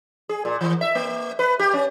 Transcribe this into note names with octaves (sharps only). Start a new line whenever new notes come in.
G#4
A#2
E3
E5
A#3
B4
G4
C#4